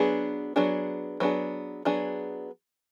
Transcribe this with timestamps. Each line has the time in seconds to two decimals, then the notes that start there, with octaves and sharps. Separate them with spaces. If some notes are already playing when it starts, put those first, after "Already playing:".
Already playing: F#3 B3 D4 G#4
0.56 F#3 B3 D4 G#4
1.20 F#3 B3 D4 G#4
1.85 F#3 B3 D4 G#4